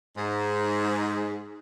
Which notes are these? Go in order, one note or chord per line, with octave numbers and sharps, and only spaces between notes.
G#2